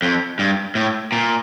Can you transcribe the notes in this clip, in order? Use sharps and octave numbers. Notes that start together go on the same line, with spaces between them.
F2
G2
A2
A#2